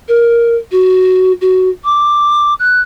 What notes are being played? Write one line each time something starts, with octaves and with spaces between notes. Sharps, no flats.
A#4
F#4
F#4
D6
F#6